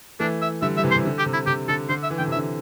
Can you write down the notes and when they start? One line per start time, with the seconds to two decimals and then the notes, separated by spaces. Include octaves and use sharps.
0.20 E3 A3 D4
0.42 E5
0.62 D3 G3 E5
0.77 G3 E5
0.83 C3 E3
0.91 C5
0.96 C3
1.05 D3
1.19 G4
1.26 C3
1.33 E4
1.46 C3 G4
1.68 D3 A4
1.89 D3 C5
2.03 E5
2.10 E3
2.18 D3 G5
2.27 C3
2.32 E5
2.37 D3